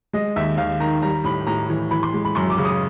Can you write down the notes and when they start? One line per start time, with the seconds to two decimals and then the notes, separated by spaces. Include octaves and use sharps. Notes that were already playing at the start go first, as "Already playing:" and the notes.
0.13 G#3 D#5
0.36 D#2 E5
0.58 D#2 F5
0.80 D#3 A#5
1.02 G3 A#5
1.24 A2 B5
1.47 A2 A#5
1.70 E3
1.91 E3 B5
2.03 C6
2.14 G#3
2.25 B5
2.35 F#2 C6
2.50 D6
2.58 C#3
2.65 D#6